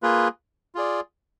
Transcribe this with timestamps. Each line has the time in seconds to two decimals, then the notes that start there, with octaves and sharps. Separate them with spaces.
0.02 A#3 F4 G#4 B4
0.75 F4 G#4 D5